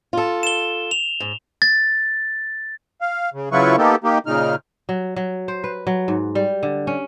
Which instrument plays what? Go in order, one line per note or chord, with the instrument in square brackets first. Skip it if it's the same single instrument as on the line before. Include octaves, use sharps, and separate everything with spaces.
[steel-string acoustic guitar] F4 A4
[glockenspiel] E7 G7
F7
[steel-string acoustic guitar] G#2
[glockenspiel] A6
[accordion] F5
C#3
C#3 F#3 E4 F4 B4 C#6
A#3 B3 D#4 G4 A4
A#3 D#4 G4
A#2 C#3 D#4 F6
[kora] F#3
F#3
C5
B4
F#3
G#2
G3
D3
C#4